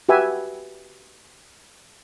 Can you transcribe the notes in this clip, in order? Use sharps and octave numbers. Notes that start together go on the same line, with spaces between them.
F#4 G4 B4 E5 G#5